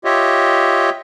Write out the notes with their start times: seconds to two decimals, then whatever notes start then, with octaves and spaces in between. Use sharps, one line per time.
0.05 F4 G4 C#5 D#5 E5